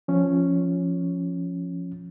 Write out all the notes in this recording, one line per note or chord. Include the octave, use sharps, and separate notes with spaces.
F3 C#4